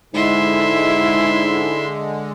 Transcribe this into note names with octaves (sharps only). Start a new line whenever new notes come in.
G#2 D3 G#3 E4 E5 C6